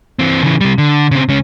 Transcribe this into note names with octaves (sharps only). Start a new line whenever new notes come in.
E3 C4
C#3 E3
C3 G3
D3
C#3 C4
C#2 C#4